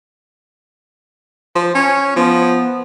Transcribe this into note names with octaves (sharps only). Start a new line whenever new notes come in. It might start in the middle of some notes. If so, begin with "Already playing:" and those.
F3
C#4
F3 B3